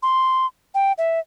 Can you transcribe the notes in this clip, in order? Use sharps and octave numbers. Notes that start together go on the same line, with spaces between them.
C6
G5
E5